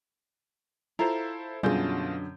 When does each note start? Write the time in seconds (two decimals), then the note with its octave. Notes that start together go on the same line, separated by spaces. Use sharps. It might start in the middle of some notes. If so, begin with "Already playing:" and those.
0.99 E4 F4 A4 C5 A#5
1.63 F#2 B2 D3 G3 F4 G#4 G#5 G6